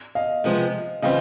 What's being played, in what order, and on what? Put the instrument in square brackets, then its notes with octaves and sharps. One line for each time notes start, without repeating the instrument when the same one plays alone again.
[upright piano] D#5 F5
[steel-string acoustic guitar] C3 F3 G#3 B3
[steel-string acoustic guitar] C#3 E3 G3 C4 F4 [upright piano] D#5 F5